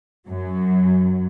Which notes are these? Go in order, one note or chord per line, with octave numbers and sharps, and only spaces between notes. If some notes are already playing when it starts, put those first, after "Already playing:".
F#2 F#3